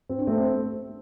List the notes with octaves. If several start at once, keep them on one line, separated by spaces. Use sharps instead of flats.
C4
D4
A3 C4